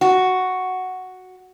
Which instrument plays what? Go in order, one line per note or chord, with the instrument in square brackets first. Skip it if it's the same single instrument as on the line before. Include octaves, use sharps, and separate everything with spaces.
[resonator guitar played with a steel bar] F#4